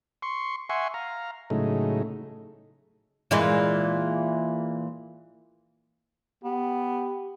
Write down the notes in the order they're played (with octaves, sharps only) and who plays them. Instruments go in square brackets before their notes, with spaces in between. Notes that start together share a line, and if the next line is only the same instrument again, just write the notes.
[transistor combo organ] C6 C#6
E5 F#5 G#5 C6 C#6
F5 A#5
A2 C#3 F#3 G#3 A3 D#4
[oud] A#2 E3 G#3
[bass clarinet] B3 [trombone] G4